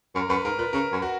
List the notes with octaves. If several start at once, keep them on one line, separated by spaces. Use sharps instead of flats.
F#2 A#4
F#2 B4
G#2 A#4
A#2 B4
C#3 A#4
F#2
F#4